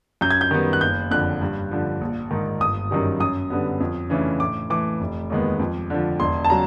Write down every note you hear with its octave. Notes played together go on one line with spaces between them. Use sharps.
F#2 G6
G#6
G6
D#3 G3 B3 D#4
F#6
F#1 G6
F2 D3 F#6
G2
D3 F3
A#1
G#2 D#3
G1 D#6
F#2 D#3 G3
F#2 D#6
D3 G3 B3
F2
C#3 E3 A3 D4
A2 D6
E3 A3 D6
F1
D#2 D#3 G#3 B3
F2
D3 F3
E1 C6
A5
C#3 F#3 A#5